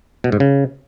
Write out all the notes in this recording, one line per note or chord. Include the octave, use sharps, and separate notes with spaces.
B2
G#2
C#3